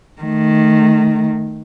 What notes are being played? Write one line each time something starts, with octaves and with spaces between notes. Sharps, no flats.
D#3 A3